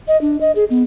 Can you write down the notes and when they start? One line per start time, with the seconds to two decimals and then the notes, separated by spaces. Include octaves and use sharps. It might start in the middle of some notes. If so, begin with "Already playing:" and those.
0.08 D#5
0.21 D4
0.41 D#5
0.56 G#4
0.70 B3